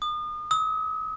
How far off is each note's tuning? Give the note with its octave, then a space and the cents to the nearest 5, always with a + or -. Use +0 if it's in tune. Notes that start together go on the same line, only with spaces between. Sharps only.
D#6 -35
D#6 +45